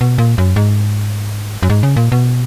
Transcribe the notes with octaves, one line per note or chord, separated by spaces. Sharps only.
B2
A#2
F#2
G#2
F#2
G#2
C#3
A#2
B2